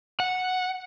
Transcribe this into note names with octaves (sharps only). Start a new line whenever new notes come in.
F#5